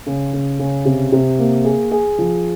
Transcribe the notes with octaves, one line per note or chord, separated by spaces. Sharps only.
C#3
C#3
C#3
C3
C3
A#3
G#4
G#4
F3